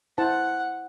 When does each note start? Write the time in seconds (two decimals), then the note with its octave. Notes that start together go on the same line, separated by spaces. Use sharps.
0.18 E4 C5 F#5 A5